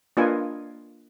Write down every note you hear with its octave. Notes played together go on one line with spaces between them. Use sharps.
A#3 D4 F4 B4 D#5 G#5